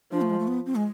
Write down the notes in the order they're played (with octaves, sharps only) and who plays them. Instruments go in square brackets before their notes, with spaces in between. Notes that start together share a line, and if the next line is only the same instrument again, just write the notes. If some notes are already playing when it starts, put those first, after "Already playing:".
[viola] F3 [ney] D4
[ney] A3
G#3
A3
B3
C4
G#3